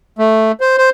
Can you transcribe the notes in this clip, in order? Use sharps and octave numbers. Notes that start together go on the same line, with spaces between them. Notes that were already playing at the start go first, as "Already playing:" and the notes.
A3
C5
C5